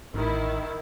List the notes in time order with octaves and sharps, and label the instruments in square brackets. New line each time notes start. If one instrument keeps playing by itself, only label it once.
[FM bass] A1 [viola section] D#3 E4